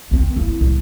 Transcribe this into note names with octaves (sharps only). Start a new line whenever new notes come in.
D2 C4
A#3 E4
C2 A2